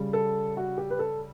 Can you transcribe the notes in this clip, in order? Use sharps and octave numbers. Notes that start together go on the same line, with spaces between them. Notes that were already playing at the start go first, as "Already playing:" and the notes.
Already playing: C#3 G3
A4
F#4
G4
B4
A4